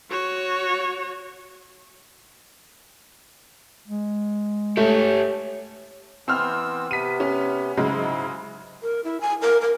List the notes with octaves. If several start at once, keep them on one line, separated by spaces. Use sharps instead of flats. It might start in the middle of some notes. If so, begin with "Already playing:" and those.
F#4 C#5
G#3
A3 G4 A4 C#5
E3 B3 C4 C6 E6 F6
C3 B3 B6 D#7
C#4
G#2 C#3 F#3 G#3 E4
A#4
E4
G#5
A#4
A#4